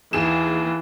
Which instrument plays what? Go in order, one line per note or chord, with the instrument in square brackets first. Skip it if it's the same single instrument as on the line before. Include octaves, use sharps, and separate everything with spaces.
[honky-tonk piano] D#2 G#4 E7 [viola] E3